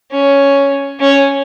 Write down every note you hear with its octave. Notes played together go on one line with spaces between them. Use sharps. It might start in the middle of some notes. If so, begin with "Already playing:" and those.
C#4
C#4